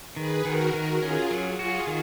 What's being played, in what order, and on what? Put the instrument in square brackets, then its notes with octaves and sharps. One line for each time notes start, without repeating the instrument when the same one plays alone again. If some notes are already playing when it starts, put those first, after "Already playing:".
[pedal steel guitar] D#3 [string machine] G#4 B4
[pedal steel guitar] D#3 [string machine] F#4 A#4
[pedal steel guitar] D#3 [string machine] F#4 A#4
[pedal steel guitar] C#4 [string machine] F4 G#4
[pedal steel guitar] F#3
[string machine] F4 G#4 [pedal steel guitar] F#4
[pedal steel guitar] D#3